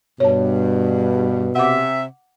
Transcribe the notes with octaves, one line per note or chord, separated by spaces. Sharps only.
G2 B2 C#5 A5
C3 E5 F#5 D6